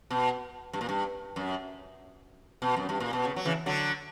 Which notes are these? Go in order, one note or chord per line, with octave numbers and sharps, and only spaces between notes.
B2
G2
A#2
G2
F#2
B2
F#2
G2
A#2
B2
C#3
F#3
C#3 E3
D3 F#3